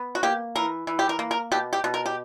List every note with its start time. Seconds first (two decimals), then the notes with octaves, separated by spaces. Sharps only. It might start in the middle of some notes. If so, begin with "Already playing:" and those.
Already playing: B3
0.15 F#4
0.23 A#3 G4
0.55 E3 A#4
0.87 E3
0.99 G4
1.09 A#4
1.19 A#3
1.31 A#4
1.52 B2 G4
1.73 G4
1.84 B2
1.94 A#4
2.06 G4